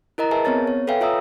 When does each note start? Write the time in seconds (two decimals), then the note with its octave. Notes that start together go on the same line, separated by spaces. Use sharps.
0.18 E4 A#4 D#5 A#5
0.31 G#4 A#4 B4 E5 G#5 A5
0.45 B3 C4 C#5 A6
0.67 C#5
0.87 A4 B4 E5 F5 G5 G#5
1.01 F4 C#5 E5 A#5 D#6 E6